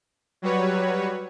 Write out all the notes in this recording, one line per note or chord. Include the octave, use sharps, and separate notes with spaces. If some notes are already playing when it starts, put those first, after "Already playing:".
F#3 G3 F#4 B4 C#5